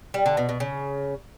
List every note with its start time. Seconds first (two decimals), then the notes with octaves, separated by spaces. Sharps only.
0.14 G3
0.26 D3
0.37 B2
0.49 B2
0.60 C#3